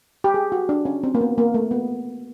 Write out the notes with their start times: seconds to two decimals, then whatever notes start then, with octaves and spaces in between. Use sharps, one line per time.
0.24 G4
0.34 G#4
0.52 F#4
0.69 D4
0.85 C#4
1.04 C4
1.15 A#3
1.21 B3
1.38 A#3
1.54 A3
1.71 B3